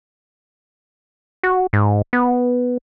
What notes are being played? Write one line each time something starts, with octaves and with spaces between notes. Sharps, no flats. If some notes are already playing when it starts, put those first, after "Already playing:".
F#4
G#2
B3